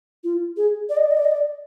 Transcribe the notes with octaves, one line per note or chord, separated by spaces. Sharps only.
F4
G#4
D5
D#5
D5
D#5
D5
D#5
D5